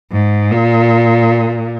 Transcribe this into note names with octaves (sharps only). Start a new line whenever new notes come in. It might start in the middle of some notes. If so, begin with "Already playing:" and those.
G#2
A#2